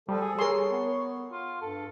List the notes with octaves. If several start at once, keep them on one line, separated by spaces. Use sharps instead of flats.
F3 G3 A4
G#4
G#4 A#4 C#5 C6
B3
F4
G2 A4